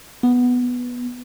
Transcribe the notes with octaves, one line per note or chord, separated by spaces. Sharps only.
B3